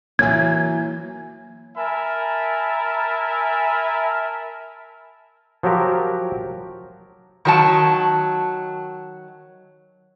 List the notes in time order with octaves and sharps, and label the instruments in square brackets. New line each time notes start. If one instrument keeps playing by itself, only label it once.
[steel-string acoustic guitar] E3 F#3 [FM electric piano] A#3 G#5 [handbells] G#6
[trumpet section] A#4 E5 G#5 A5 B5
[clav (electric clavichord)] F3 F#3 F#4 G4 A#4
[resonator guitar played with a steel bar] D#3 F#3 A5